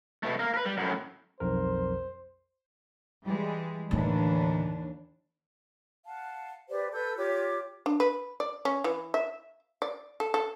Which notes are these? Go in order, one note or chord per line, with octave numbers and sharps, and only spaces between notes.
B2 A3
A#3 A#4
A#4 B4
G3
F#2 A2
B1 F2 A#4 C5
E3 G3 G#3
D#2 A2 D3 E3 D4
F5 F#5 A5
G4 B4 C5 D5
A4 B4 E6 G6
F4 G4 C#5 D6
D4
B4
D5
C#4
E3
E5
D5
A4
A4